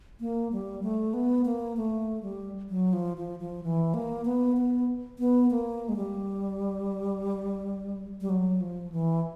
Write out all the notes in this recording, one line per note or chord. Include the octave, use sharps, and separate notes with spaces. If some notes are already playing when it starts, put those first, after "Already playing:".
A#3
G3
A3
B3
A#3
A3
G3
F#3
F3
F3
F3
E3
A#3
B3
B3
B3
A#3
G#3
G3
G3
F#3
F3
E3